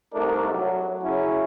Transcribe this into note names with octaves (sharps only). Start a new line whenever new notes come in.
C2 A3 D4 D#4 A#4
F#3
C#3 F#3 C#4 E4